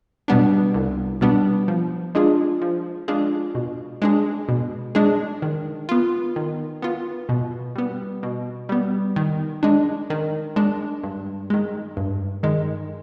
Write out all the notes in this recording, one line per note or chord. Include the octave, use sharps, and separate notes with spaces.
B2 G3 B3 D4
C2
B2 G3 B3 D4
F3
G#3 D4 F4 G#4
F3
G#3 D4 F4 G#4
B2
G#3 D4 G#4
B2
G#3 D4 G#4
D#3
B3 F4
D#3
B3 F4
B2
G3 B3
B2
G3 B3
D#3
G#3 D4
D#3
G#3 D4
G2
D#3 G#3
G2
D#3 G#3